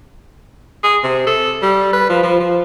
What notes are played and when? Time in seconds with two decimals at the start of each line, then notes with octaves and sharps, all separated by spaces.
0.83 G#4
1.03 C3
1.26 A4
1.62 G3
1.93 B4
2.09 F3
2.23 F3
2.40 F3